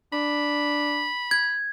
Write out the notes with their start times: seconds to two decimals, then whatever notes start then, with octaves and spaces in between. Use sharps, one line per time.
0.13 D4 B5
1.31 G#6